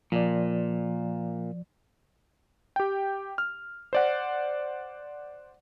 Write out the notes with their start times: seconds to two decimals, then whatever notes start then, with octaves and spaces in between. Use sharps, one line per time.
0.12 A#2 F3 D5
2.76 G4 G5
3.38 F6
3.93 C5 D5 F#5